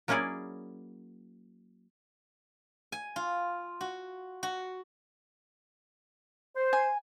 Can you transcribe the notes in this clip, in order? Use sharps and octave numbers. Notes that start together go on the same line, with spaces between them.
F#3 A#3 C#4 E4 G#4 D5
G#5
F4
F#4
F#4
C5
G#5